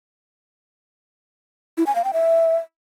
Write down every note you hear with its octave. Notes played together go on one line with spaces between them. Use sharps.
E4
G#5
F5
G5
E5